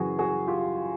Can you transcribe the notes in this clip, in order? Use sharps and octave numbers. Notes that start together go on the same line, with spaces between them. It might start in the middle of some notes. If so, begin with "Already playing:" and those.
Already playing: F#2 C#3 E3 F#4 G#4
F#4 G#4
F4 G4